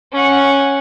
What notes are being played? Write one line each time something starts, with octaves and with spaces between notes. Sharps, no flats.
C#4 F#5